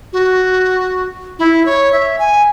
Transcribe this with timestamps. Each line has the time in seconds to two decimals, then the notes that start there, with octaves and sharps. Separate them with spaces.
0.13 F#4
1.39 E4
1.66 C#5
1.92 E5
2.19 G#5